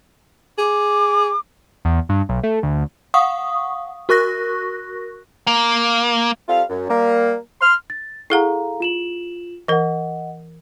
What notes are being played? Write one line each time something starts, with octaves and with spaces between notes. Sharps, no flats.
G#4 D6
E2
G2
B1
A3
D2
F5 F#5 C#6 D#6
F#4 A#4 C#6 F#6 A#6
A#3
G3 C4 F4 A4 F5
F#2
G3 A#3
C6 F6
A6
E4 G#4 A4 F5 F#5 A#5
F4 E7 F#7
E3 A#4 D#5 F#5